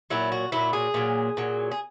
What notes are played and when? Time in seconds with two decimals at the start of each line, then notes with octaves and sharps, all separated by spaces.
0.10 A#2 F#3 E4
0.32 F#4
0.52 A#2 F#3 E4
0.73 G#4
0.94 A#2 F#3
1.37 A#2 F#3
1.71 G#4